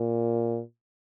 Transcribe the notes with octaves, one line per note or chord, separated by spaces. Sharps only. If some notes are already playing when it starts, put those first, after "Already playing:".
Already playing: A#2